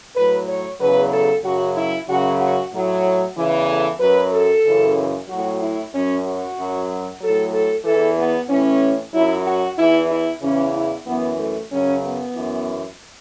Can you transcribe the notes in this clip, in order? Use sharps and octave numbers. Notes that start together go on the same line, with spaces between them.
A2 F#3 B4
C#5
E2 C#3 F#3 B4
A4
F#2 C#3 F#3 F#4
E4
F#2 C#3 F#3 F#4
F#4
A2 F#3
E2 C#3 E3
A4
F#2 F#3 B4
A4
F#2 C#3 E3
A2 F#3 F#4
E4
F#2 F#3 C#4
F#4
F#2 F#3
A2 F#3 A4
A4
E2 E3 A4
B3
A2 E3 C#4
F#2 F#3 E4
F#4
E2 E3 E4
E4
E2 C#3 E3 C#4
E4
F#2 E3 B3
A3
F#2 C#3 F#3 C#4
B3
F#2 E3